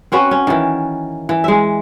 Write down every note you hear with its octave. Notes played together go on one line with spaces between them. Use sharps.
C4 C#4 F#4 B4
C#4
D#3 E3
E3
G#3 E5